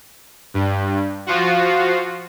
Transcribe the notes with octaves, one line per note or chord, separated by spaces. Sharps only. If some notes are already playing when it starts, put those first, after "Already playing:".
G2
F3 F4 F#4